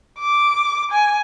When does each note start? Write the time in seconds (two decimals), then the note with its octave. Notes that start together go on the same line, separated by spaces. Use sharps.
0.19 D6
0.91 G#5